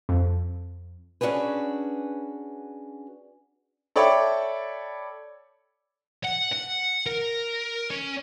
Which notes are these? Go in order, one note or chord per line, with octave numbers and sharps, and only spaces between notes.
F2
C#4 D4 F#4 G#4 B4
A4 C#5 D5 E5 G5 B5
F#5
F#5
A#4
C#4